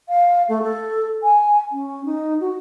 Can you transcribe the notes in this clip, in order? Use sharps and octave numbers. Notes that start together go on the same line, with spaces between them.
F5
A3
A4
G#5
C#4
D#4
F#4